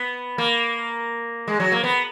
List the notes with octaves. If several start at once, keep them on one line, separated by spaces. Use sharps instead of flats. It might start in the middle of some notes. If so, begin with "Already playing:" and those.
Already playing: B3
A#3
G#3
F#3
A#3
B3